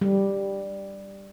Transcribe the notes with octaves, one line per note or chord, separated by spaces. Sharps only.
G3